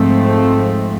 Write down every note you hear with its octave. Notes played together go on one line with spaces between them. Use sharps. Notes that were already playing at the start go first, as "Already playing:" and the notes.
Already playing: G#2 F3 A3 C4